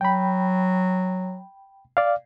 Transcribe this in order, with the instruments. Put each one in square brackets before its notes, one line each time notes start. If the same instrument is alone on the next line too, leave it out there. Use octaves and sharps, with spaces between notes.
[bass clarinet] F#3 [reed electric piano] G5 B5
[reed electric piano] D5 F5